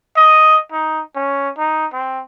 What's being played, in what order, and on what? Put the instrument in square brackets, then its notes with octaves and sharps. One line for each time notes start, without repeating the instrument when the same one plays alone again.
[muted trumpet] D#5
D#4
C#4
D#4
C4